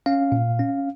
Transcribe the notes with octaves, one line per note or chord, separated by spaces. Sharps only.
C#4 F5
A#2
C#4